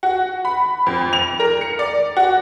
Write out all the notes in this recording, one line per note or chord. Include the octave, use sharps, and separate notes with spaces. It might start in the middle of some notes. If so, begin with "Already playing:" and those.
F#4
B5
F2
F7
A#4
C#7
D5
F#4